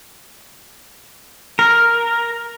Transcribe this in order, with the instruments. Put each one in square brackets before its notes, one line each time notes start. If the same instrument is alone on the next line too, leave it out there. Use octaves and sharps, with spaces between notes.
[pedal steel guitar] A#4